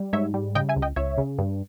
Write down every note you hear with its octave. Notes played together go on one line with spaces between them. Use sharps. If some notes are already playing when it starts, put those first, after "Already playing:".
Already playing: G3
G#2 C#5 E5
G3
C#3 D#5 G5
E5 G#5
C#2
D#5 G5
C#2 C#5 E5
C#3
G2